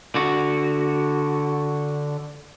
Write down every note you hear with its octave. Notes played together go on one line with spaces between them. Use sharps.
D3 F#4